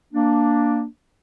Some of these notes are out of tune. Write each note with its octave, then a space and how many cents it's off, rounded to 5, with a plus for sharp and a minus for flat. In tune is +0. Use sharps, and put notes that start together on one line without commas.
A#3 +0 D4 +0